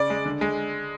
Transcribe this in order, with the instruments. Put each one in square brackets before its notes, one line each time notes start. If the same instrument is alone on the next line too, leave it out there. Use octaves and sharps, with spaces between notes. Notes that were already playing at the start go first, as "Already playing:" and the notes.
Already playing: [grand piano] C#3 D5
G#3
D3
G#3